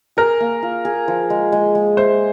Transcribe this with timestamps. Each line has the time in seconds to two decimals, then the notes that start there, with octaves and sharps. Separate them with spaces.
0.17 G#4 A#4
0.40 A#3
0.63 F4
0.85 G#4
1.08 F3
1.30 G#3
1.52 G#3
1.75 G#3
1.97 C5 E5